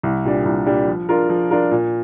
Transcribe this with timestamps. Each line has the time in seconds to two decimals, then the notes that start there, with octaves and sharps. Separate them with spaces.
0.03 C2
0.25 A#2 G3 D4
0.45 C2
0.66 A#2 G3 D4
0.87 F3
1.09 D4 F4 A#4
1.30 F3
1.51 D4 F4 A#4
1.72 A#2